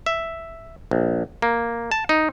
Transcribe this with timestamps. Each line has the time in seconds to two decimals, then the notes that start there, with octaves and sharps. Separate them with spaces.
0.06 E5
0.91 A#1
1.42 A#3
1.91 A5
2.09 D#4